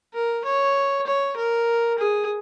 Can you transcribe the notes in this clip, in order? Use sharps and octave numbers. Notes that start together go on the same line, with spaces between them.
A#4
C#5
C#5
A#4
G#4